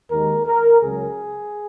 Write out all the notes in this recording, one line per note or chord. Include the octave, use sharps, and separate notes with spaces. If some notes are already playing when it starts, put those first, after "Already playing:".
D#2 D#3 G#3 A#4
A#4
C#2 C#3 F#3 G#4